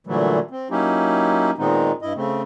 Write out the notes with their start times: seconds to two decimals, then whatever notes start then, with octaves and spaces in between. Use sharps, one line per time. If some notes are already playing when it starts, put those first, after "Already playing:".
0.07 A#2 D3 E3 F#3 G3 A3
0.51 C4
0.71 F#3 A#3 C#4 D#4 E4 G4
1.58 A#2 D#3 G#3 B3 C4 D#4
2.02 G2 E4 D#5
2.15 C#3 A3 C4